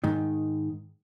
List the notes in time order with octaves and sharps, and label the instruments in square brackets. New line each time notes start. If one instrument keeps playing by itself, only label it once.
[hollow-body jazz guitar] G#2 D#3